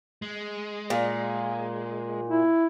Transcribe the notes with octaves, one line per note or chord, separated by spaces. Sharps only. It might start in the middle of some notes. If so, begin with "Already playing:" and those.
G#3
A#2
E4